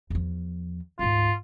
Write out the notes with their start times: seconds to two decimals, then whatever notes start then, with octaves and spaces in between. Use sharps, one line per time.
0.10 E2 F3
0.99 D2 G#2 F4